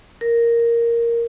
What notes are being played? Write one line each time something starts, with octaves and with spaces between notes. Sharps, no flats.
A#4